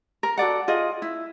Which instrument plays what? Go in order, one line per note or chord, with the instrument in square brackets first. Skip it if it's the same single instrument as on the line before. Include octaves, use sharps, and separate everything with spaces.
[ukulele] A#4
F#4 A4 D5 F#5
F4 G#4 D#5
E4